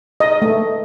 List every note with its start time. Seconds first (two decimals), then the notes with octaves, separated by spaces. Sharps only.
0.20 D#5
0.42 A3